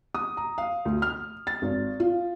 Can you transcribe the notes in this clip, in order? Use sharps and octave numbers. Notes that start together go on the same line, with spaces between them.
D#6
A#5
F5
D2
F6
A6
G#1
F4